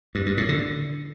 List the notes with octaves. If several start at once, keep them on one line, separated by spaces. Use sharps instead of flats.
G2
G2
A2
D3